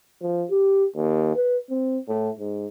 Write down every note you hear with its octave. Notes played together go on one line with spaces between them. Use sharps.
F3
G4
D#2
B4
C4
A2
G#2